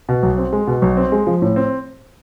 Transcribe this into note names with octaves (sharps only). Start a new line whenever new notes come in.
B2
B1
C4
G#3
B2
B1
C4
G#3
F3
A2
C4